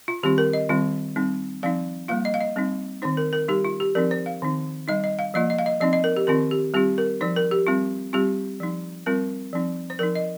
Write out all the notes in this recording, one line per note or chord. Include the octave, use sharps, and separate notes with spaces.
F4
D#3 G3 C4 F4 G4
A#4
D#5
D#3 G3 C4 F4
G3 C4 D#4
F3 C4 D#4 F5
G3 A#3 F4 F5
D#5
F5
D#5
G3 C4 D#4
D#3 C4 D#4 C5
A#4
A#4
G3 D#4 G4
F4
G4
F3 C4 D#4 A#4
C5
F5
D#3 C4 D#4
G3 D#4 D#5
D#5
F5
F3 A#3 F4 D#5
D#5
F5
D#5
F3 C4 D#4 D#5
D#5
A#4
G4
D#3 C4 F4 A#4
G4
G3 C4 F4 G4
A#4
F3 D#4 C5
A#4
G4
G3 C4 F4
G3 C4 F4 G4
F3 D#4
G3 C4 F4 A#4
F3 C4 D#4
C5
F3 D#4 A#4
D#5